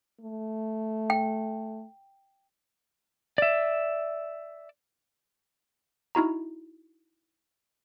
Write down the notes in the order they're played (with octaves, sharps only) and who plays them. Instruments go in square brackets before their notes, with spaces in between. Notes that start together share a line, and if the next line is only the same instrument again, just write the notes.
[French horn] A3
[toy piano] G5
[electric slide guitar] D5 E5
[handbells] D#4 E4 F#4 A#5